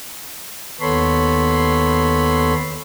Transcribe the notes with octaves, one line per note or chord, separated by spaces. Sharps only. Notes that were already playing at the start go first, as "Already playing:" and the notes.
D#2 B3 A4 C#5 B5 C6